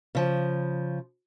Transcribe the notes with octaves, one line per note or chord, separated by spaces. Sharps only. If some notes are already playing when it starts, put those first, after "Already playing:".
C#3 F3